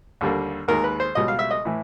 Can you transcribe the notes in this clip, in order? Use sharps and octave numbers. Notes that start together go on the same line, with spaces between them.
D#2 D3 G3 A#3
D#2 D#3 G#3 A#4
B4
C5
C#2 B2 G3 D#5
F5
E5
D#5
A2 E3